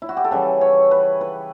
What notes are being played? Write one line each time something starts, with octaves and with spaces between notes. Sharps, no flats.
E4
F#4
G4
A4
C#3 E3 G3 B4
C#5
B4
B4